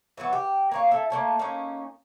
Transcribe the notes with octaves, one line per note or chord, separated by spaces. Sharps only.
E3 F#3 B3 F#4
G4
A#3 C#5 F5
E4 A4
A3 A#3 C#5 A5
A#3 C#4 D#4